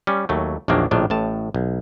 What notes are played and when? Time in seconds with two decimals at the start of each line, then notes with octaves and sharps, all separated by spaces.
0.07 G3 C#4
0.29 D#2 F#3 A3
0.68 A#1 E2 D#3 F#3 A#3 D4
0.91 A#1 A2 D#3 D4
1.10 A1 A2 A5
1.55 B1